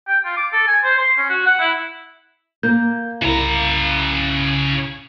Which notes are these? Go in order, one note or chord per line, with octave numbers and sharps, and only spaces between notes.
G5
F4
D6
A4
G#5
C5
C6
C#4
F#4
F#5
E4
A#3 G6
C2 C#3 E4 A#5